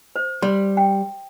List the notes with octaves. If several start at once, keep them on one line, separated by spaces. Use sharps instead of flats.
C5
G3 C6
G5